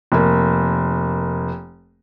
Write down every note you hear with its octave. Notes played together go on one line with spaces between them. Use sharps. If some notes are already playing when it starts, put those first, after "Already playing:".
F1 A#3